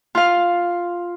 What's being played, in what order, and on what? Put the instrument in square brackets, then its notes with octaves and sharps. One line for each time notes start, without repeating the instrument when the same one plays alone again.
[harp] F4 F5